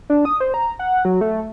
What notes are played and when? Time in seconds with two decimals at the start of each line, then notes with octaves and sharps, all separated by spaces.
0.10 D4
0.25 D#6
0.40 C5
0.54 A#5
0.79 F#5
1.05 F#3
1.21 A3